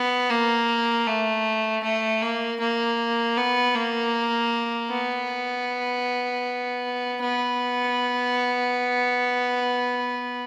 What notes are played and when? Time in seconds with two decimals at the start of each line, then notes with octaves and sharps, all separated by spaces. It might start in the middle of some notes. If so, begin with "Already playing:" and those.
Already playing: B3
0.30 A#3
1.07 A3
1.84 A3
2.22 A#3
2.60 A#3
3.38 B3
3.75 A#3
4.90 B3
7.21 B3